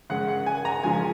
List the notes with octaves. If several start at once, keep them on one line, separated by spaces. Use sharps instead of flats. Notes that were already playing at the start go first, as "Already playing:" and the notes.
C#3 G#3 F#5
F#5
G#5
A#5
C#3 F3 G#3 G#5